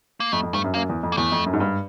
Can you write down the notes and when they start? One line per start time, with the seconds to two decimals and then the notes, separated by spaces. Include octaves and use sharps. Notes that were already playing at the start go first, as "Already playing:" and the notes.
0.20 A#3
0.32 F2 A3
0.43 F2
0.53 G2 A3
0.64 F#2
0.74 F#2 A#3
0.89 E2
1.03 F2
1.12 A#3
1.17 E2 A3
1.32 F2
1.46 F#2
1.53 G#2
1.60 G2